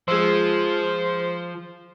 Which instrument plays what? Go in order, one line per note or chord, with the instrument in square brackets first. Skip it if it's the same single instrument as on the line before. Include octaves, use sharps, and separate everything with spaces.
[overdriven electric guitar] F3 [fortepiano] G#3 E6 [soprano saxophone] C5